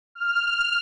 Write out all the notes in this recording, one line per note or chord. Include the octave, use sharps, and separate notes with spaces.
F6